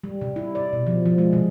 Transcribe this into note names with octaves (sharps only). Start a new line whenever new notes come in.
G3
C3
E4
D5
B2
F3
F3
G#3
C3